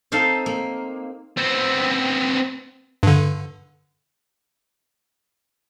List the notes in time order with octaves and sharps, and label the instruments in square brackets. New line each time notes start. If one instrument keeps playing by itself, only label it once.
[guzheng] C4 D#4 A4 F5
A#3
[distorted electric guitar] B3 C4
[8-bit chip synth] G2 D3